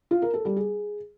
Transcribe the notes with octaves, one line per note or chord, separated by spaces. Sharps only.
F4
A#4
A4
G3
G#4